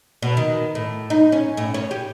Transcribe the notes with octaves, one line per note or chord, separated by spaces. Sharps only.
B2
D#3
A2
D#4
C#4
A2
C#4
G4